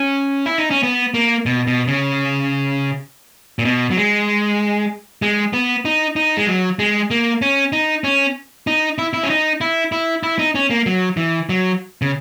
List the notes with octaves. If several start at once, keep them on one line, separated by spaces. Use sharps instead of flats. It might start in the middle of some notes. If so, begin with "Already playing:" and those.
Already playing: C#4
E4
D#4
C#4
B3
A#3
B2
B2
C#3
A#2
B2
F#3
G#3
G#3
B3
D#4
D#4
G#3
F#3
G#3
A#3
C#4
D#4
C#4
D#4
E4
E4
C#4
D#4
E4
E4
E4
D#4
C#4
A#3
F#3
E3
F#3
C#3